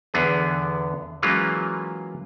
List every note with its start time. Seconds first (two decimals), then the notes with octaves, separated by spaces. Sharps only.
0.14 E2 D3 B3 G#4
1.22 E3 F#3 G#3 A#3 C#4 F4